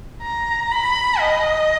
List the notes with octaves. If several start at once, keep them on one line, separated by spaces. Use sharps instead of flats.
A#5
B5
D#5